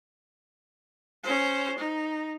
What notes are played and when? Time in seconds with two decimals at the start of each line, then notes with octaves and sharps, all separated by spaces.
1.24 C#4 C5
1.78 D#4